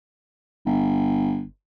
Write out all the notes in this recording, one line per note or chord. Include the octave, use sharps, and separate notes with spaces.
G1